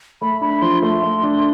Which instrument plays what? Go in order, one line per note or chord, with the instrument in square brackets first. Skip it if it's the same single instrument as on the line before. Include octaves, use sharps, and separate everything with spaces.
[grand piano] A3 [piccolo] B5
[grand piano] D4 [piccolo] B5
[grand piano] F3 [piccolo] C6
[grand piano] A3 [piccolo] C6
[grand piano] A3
D4